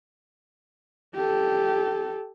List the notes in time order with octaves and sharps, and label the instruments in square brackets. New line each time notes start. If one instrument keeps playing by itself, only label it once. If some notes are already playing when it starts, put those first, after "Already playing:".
[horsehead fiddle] G4 A4